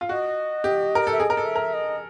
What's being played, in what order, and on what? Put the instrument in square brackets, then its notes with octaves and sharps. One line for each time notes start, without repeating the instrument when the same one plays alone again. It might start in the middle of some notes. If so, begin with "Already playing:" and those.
[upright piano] F4
[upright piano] F#4 [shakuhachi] D#5
[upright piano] G4
A#4
A4
[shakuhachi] E5
[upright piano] G#4 [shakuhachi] D#5
[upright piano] A#4
A4
[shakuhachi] E5
[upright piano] A#4
[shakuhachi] D#5